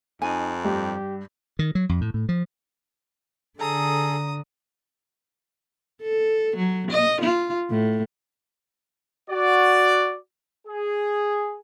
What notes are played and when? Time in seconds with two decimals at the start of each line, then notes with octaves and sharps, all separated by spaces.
0.22 F2 D#4 G#5
0.65 G2 G4
1.59 D#3
1.75 F#3
1.89 F2
2.01 A2
2.14 A2
2.29 F3
3.59 D3 G#4 A4 A#5 D#6
6.01 A4
6.56 F#3
6.91 D#5
7.21 F4
7.70 A2
9.30 F#4 D5
10.67 G#4